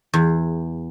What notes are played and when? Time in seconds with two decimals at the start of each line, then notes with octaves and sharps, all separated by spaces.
0.14 E2